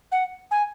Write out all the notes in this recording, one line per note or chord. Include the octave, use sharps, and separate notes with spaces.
F#5
G#5